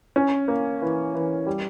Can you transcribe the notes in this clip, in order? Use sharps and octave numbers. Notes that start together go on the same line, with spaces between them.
C#4
A#3
E3
E3
G3